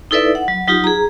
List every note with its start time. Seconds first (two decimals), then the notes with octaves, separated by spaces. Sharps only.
0.11 D#4 E4 A4 B4 D5 E5
0.35 F#5
0.48 F#3
0.67 F#3 D#4 F4 G4
0.84 G#4 A#5